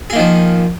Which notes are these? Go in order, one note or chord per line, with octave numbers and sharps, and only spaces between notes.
D#3 F3 A#3 G#4